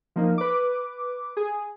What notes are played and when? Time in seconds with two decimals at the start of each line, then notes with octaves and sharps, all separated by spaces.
0.16 F3 A#3 D#4
0.38 B4 D6
1.37 G#4